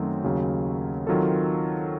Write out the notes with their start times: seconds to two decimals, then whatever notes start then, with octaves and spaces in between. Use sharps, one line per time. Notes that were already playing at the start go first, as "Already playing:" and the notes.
Already playing: F#2 D#3 F#3 A3 C4
0.24 D#2 C#3 F#3
1.07 D#3 F#3 C4 F4 A4